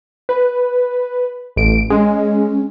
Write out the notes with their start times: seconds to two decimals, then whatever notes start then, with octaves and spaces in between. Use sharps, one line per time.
0.29 B4
1.56 A1 D7
1.90 G#3 C#4